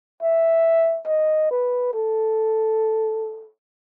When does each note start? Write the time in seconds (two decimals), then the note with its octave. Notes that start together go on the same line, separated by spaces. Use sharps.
0.22 E5
1.07 D#5
1.51 B4
1.94 A4